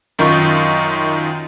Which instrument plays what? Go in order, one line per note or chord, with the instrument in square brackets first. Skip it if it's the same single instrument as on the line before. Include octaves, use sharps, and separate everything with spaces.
[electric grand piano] F#2 D#3 D#4 F4 C#6